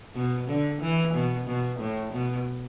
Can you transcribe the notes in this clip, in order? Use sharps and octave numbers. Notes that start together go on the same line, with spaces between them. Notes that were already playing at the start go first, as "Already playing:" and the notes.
B2
D3
E3
B2
B2
A2
B2